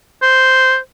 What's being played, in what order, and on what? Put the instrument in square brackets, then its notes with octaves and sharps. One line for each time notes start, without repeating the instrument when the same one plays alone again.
[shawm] C5